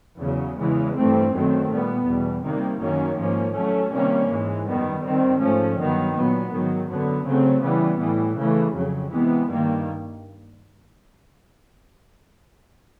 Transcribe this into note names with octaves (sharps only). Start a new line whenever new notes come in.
E2 C#3 F#3
E2 C#3 E3 G#3
G2 E3 A3 C4
F#2 D#3 F#3 A3 C4
A#2 G3 B3
E2 B2 G3
C3 D#3 G3 A#3
F#2 D#3 F#3 A#3 C#4
G#2 F3 A#3 C#4
A2 F#3 A3 C#4
C3 D#3 G3 A#3 C#4
G#2 E3 G#3
F#2 D#3 G3 B3
G2 D#3 G3 C4
G#2 F3 A3 C#4
G2 D#3 F#3 B3
A#2 F#3 B3
G#2 D#3 F#3
F#2 D3 F#3 B3
C#3 F#3 A3 C4
C#3 E3 G3 B3
A2 E3 G3
C#3 E3 A3
F2 C#3 F#3
C3 E3 G#3 B3
G2 D#3 G3 A#3